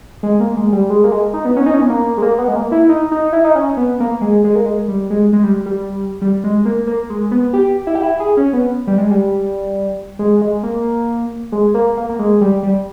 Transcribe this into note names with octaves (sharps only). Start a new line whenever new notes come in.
G#3
A#3
G#3
G3
G#3
A#3
G#3
D#4
B3
C#4
D#4
C#4
B3
A#3
G#3
A#3
B3
G#3
A#3
E4
D#4
D#4
E4
D#4
C#4
B3
A#3
G#3
G#3
A#3
G#3
G3
G#3
G#3
G3
G3
G3
G#3
A#3
A#3
G#3
B3
G4
E4
G4
E4
G#4
C#4
B3
G3
G#3
G3
G#3
G#3
A#3
G#3
A#3
A#3
A#3
G#3
G3
G3